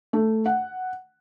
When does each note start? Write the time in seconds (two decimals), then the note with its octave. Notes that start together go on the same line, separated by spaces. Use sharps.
0.13 A3
0.46 F#5